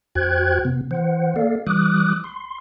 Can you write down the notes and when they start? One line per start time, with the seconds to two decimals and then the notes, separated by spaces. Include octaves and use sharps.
0.15 F2 F#4 C5 G5 F#6 G#6
0.65 C3 B3
0.91 E3 C5 F#5
1.36 A#3 A4 D5 F5
1.67 E3 G3 D6 D#6 F#6
2.24 C6